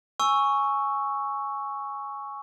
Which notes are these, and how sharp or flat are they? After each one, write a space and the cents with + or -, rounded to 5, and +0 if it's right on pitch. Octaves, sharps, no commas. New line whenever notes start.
G#5 +0 C#6 +0 E6 +0